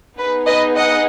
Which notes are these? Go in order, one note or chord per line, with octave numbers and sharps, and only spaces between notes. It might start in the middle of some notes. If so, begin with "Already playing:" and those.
B3 D#4 G#4 B4
B4 D#5
D#5 F#5